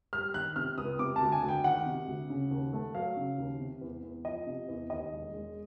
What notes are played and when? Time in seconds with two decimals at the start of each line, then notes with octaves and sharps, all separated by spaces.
0.13 G3 F6
0.34 D#3 F#6
0.56 C3 F6
0.78 C#2 D#6
0.99 C3 D6
1.16 A5
1.21 D2
1.32 G#5
1.43 D2
1.48 G5
1.64 D#3 F#5
1.86 C3
2.08 D2
2.30 C#3
2.51 D#2
2.73 A3
2.95 F#3 F5
3.17 C#3
3.38 D#2
3.60 C3
3.81 E2
4.03 E2
4.25 F3 D#5
4.47 C3
4.68 E2
4.90 D#2 D#5
5.12 E1
5.33 G#3